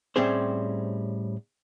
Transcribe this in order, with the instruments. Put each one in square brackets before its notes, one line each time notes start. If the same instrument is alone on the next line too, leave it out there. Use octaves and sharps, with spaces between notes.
[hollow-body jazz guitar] A2 G3 C4 C#4 G#4 C5